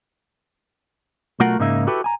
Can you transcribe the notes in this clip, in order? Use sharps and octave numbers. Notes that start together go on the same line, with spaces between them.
B1 A3 F4 F#4 A#4 F#5
G#2 C#3 A#3 D#4 E5
E4 F#4 G4 A4 B4
G#5 A#5